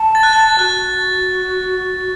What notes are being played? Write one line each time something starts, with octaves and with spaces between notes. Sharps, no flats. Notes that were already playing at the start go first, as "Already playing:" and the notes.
Already playing: A5
A6
F#6
A6
F#4 F#6